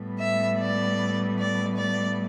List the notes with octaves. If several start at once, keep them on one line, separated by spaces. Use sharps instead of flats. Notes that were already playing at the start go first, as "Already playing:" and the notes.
Already playing: A2 G3 B3
E5
D5
D5
D5